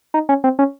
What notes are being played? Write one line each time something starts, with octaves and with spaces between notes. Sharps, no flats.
D#4
C#4
C4
C#4